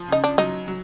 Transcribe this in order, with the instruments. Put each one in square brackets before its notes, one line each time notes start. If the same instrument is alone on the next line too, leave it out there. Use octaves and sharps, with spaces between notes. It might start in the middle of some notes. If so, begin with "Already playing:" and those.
Already playing: [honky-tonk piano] F3
[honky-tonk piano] C#3 [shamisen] D#4
[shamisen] D4
[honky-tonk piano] F#3 [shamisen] D#4
[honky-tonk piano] F#3